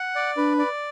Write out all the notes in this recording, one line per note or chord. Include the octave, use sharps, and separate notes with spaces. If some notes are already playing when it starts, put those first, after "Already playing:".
Already playing: F#5
D5
D4 B4
D5